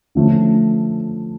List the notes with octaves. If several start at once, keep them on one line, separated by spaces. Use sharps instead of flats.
D3 F3 A3 C#4